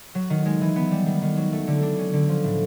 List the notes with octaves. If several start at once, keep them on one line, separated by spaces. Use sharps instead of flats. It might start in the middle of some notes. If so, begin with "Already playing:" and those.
F#3
D#3
G#3
E3
B3
G3
D#3
D#3
F#3
A3
D3
D4
C#4
D3
F3
A2